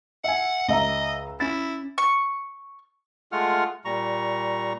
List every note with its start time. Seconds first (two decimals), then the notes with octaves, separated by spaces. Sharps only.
0.24 E5 F#5 G#5
0.68 C#2 D#5 E5 A#5
1.40 C#4 E4 A6
1.98 C#6
3.32 G#3 A3 F4 F#5 F6
3.85 A#2 G3 A#5 C#6